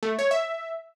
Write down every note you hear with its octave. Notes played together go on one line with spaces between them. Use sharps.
A3
C#5
E5